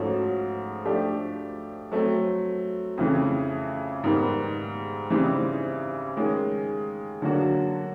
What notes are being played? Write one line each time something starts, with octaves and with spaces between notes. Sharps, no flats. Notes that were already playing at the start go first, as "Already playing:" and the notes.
Already playing: G#2 F3 A3 C#4 F#4
F3 A3 D4 G4
F#3 A3 C4
F2 C#3 E3 A3
G#2 D#3 G3 B3
C#3 E3 G3 C4 D#4
D#3 G#3 C#4
D3 F#3 A#3 D4 F#4